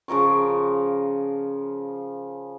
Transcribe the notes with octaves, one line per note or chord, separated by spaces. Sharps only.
C#3 F3 A#4 C#5